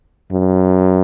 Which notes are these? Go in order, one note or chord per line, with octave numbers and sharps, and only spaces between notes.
F#2